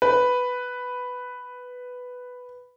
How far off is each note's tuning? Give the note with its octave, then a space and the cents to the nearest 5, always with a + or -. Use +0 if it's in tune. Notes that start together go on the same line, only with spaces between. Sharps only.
B4 +5